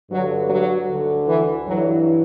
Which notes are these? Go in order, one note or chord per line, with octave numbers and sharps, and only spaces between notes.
G2 D3 F#3
F#3
D2 D3
E3
G2 E3 F#3